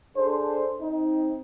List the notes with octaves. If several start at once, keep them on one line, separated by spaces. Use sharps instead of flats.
D4 G#4 A4 C5
C4 D#4